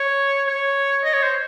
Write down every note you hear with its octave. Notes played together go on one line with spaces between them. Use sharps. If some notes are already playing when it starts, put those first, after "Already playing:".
Already playing: C#5
C#5
D#5
C#5
C5